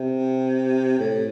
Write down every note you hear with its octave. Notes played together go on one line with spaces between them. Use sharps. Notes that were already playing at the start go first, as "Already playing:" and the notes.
Already playing: C3
A2